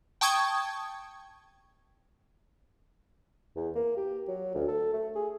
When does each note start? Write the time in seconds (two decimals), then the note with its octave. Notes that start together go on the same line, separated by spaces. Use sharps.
0.21 G5 A5 C#6 D#6 G#6
3.56 E2
3.75 A#3
3.97 G4
4.28 F#3
4.55 D2
4.68 A4
4.93 A3
5.15 G#4